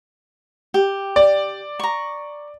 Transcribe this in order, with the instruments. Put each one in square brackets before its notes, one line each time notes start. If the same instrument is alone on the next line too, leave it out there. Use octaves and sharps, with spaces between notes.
[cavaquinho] G4
[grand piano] D5
[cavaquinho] A#5 C#6